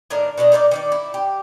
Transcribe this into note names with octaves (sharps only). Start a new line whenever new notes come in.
A2 D#3 D4 A#4
B2 D4 D5 D#5
D#4 A#4 C5 D5
D#3 C5 D5
E4
G4